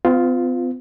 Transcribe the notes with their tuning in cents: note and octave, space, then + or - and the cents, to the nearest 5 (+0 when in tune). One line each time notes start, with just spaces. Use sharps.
C4 -45 F4 +0